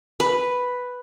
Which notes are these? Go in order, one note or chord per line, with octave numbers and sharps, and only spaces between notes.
B4